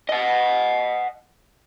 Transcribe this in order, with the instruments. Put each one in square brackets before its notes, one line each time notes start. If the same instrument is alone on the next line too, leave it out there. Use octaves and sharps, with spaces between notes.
[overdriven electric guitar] D#5 F#5